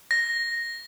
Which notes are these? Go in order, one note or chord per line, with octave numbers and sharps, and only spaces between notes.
A#6